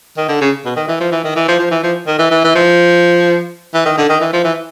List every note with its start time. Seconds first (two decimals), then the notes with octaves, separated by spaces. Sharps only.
0.17 D#3
0.29 D3
0.41 C#3
0.65 B2
0.76 D#3
0.88 E3
1.00 F3
1.12 E3
1.24 D#3
1.36 E3
1.48 F3
1.59 F3
1.71 E3
1.84 F3
2.07 D#3
2.19 E3
2.31 E3
2.44 E3
2.55 F3
3.74 E3
3.86 D#3
3.97 D3
4.09 D#3
4.21 E3
4.33 F3
4.44 E3